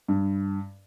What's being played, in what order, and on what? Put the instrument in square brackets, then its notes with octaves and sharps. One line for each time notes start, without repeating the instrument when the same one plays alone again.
[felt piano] G2